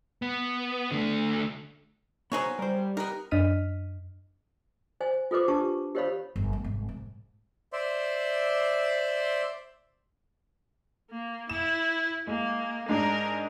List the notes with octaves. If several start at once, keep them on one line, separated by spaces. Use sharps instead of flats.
B3
D3 A3
F#3 B3 D#4 G#4 C5 C#5
G3 A#4 C5
B3 D#4 A#4
F#2 D4 D#5 F6 B6 D#7
C5 G#5
F4 A4 B4 C5 D6
D4 G4 A5 C#6
G4 A#4 C5 C#5 F5 B5
G1
A3
G#1
G#2
C5 D5 E5 C6
A#3
E4 E7
G#3 A#3
G#2 G#3 D4 A#4